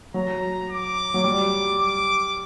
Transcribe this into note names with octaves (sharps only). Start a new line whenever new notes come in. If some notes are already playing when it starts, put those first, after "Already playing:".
F#3 A#5
D6
F#3
G3 D6
D6